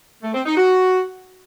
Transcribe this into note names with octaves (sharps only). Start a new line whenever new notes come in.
A3
C4
D#4
F#4